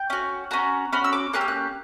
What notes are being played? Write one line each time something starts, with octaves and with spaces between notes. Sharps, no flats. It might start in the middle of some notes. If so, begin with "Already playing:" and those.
Already playing: G5
C#4 F#4
C#4 F#4 A#5
C#4 F#4 B5
E6
D6
A#3 C#4 G4 F#6
E6
F#6